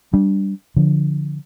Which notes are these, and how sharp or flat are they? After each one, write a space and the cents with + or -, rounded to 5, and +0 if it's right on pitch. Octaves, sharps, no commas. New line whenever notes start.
G3 -10 D4 -10
D3 -5 F3 +0